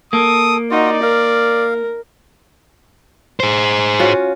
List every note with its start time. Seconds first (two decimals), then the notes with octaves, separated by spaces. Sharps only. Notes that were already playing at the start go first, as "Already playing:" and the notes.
0.13 A#3 A4 D#6
0.71 D#4 F4 F#4 D5
1.03 A#4 F5
3.40 G#4 C5
3.99 C#4 F4 F#4